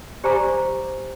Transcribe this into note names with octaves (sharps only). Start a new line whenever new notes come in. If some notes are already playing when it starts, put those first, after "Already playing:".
G4 C5 D5 G#5 A#5 D6